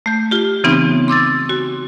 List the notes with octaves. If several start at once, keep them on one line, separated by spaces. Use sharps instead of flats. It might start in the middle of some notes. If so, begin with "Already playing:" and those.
A3 G6
F4 G4
C#3 E3 B3 C4 D#4
C6 D6 E6 A6
F#4